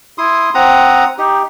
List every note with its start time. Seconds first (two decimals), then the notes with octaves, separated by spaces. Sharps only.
0.18 E4 C6 D#6
0.55 C4 F#5 A#5 D#6
1.18 D#4 G4